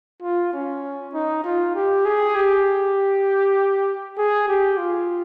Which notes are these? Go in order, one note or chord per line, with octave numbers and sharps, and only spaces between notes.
F4
C#4
D#4
F4
G4
G#4
G4
G#4
G4
F4